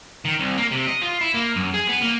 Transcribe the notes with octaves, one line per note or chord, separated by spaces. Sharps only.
D#3
C2
A#3
C3
D#5
F4
E4
A#3
F#2
G#4
B3
A#3